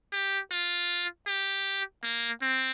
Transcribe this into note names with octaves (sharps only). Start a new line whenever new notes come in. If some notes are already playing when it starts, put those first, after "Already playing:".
G4
F4
G4
A#3
C4